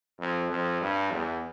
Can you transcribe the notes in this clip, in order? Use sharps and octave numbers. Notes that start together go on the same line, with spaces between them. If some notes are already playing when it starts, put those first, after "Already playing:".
F2
F2
G2
E2